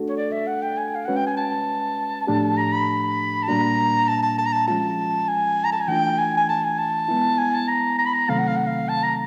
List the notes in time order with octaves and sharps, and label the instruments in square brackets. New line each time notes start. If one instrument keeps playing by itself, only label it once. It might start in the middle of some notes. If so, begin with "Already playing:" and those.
Already playing: [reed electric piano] A3 D4 F#4 A4
[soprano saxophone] C#5
D5
E5
F#5
G5
G#5
F5
[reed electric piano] G#3 C#4 F#4 B4 [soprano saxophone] F#5
[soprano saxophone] G5
G#5
A5
[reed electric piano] A2 F3 A3 D4 G4
[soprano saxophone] A#5
B5
A5
[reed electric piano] A#2 G3 A#3 D4 F#4 [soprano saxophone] A#5
[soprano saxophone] A5
A5
A5
A#5
A5
[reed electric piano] F3 G#3 C#4 F4 [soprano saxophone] A5
[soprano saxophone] G#5
A#5
A5
G#5
[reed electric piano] E3 A3 D4 F4 [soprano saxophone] G5
[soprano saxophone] G#5
G#5
A5
G#5
A5
[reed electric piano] G#3 B3 E4
[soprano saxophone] G#5
A5
A#5
A#5
B5
A#5
[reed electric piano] C3 D#3 F#3 A3 C4 [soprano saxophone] F5
[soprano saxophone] F#5
F5
F#5
F5
A5
A#5